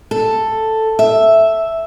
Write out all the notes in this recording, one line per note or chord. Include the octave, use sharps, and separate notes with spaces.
A4
E5